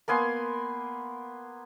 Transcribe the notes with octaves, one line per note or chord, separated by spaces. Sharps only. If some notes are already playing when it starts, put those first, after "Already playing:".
A#3 B3 G#5 C6